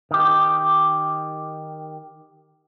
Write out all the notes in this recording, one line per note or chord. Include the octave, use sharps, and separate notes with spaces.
D#3 G4